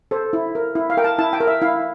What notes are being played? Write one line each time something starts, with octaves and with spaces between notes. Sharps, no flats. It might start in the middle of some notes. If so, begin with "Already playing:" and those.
A4 C5
E4
A#4
E4
F5
A#4 G5
A5
E4 A5
G5
A#4
E5
E4 F5